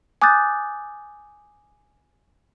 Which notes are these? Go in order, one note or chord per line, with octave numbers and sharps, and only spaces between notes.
G#5 D6 D#6 F#6 G6 A6